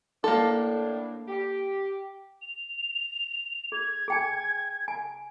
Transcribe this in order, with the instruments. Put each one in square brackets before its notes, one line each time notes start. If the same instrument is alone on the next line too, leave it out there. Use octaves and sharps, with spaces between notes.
[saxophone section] A2 D4 [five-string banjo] A#3 A4
[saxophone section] G4
[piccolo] F7
[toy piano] G#4 [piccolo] G#6
[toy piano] G#4 G5 G#5
G#5